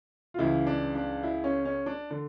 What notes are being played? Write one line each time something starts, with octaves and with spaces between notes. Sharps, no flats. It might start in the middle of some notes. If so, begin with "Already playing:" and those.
F4
C#2 C#3 E3 E4
D4
D4
E4
C#4
C#4
D4
D3